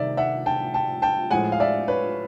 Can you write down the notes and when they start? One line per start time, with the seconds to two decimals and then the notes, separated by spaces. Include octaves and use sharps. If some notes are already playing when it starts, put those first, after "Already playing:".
Already playing: C3 D#3 G3 D5 E5
0.17 E5 F#5
0.46 G5 A5
0.74 G5 A5
1.02 G5 A5
1.31 A2 F3 G#3 F#5 G#5
1.52 F5
1.60 D5 E5
1.88 B4 C#5